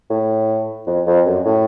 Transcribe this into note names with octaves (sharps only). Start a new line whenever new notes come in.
A2
F2
F2
F#2
A2